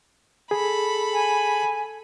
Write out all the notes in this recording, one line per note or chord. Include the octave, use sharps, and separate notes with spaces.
G#4 A4 B5
G#5